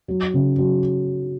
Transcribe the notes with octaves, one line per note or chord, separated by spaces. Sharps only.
F#3
C#3
F#3